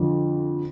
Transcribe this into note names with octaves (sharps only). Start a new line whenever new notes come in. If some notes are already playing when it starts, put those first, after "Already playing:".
Already playing: F2 D3 F3